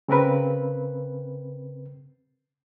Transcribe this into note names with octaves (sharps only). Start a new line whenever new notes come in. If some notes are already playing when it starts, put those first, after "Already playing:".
C#3 C4 A#4 B4